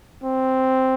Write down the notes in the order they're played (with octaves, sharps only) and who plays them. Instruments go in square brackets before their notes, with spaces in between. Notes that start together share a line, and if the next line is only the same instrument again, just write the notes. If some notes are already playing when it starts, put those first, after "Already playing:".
[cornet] C4